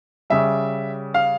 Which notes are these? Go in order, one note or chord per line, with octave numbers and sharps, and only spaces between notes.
C#3 G3 E5
F5